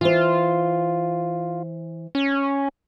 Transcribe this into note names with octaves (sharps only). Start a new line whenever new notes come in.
E3 F4 C5
C#4